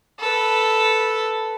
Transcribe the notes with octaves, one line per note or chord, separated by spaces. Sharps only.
A4 B4